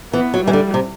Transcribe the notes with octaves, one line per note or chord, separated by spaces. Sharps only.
E3 B3
F#3
E3 G3
D3
C3